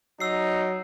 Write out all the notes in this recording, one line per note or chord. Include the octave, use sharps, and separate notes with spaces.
F#3 D#4 E6 C7